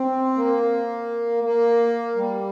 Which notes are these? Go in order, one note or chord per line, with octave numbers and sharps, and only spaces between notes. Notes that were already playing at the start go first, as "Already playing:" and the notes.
Already playing: C4
A#3
A#3
G3